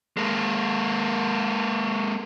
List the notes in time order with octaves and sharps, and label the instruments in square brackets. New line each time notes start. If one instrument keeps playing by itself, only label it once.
[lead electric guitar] G#3 A#3